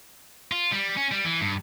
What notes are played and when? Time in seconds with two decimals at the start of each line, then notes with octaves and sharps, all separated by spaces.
0.52 F4
0.72 G3
0.97 C#4
1.11 G3
1.24 E3
1.41 G2